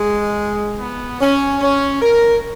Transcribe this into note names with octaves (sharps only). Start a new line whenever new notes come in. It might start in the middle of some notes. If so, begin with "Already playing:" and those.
Already playing: G#3
B3
C#4
C#4
A#4